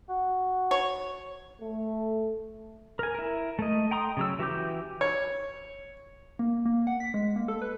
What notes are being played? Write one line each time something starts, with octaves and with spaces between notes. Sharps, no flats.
F#4
C#5
A3
A#4 G#5
E4 A#4
A3 D#5
G5 A#5 C6 D#6
C#3 F#3 E6
E3 F#4 G4 D6 G6
C#5
A#3
A#3
F#5
B6
G#3
A#3
A4
B4